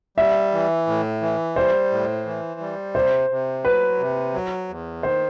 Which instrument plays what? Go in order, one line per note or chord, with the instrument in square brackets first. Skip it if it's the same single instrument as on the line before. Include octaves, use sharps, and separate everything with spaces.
[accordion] G3 [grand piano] E5
[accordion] E3
A2
E3
[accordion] G3 [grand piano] C5
[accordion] A2
E3
G3
[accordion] C3 [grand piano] C5
[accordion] C3
[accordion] F#3 [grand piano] B4
[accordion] C3
F#3
E2
[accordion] D#3 [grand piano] C5